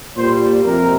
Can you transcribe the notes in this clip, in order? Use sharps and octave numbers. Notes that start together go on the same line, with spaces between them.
A#2 G3 C5
F2 C3 A#4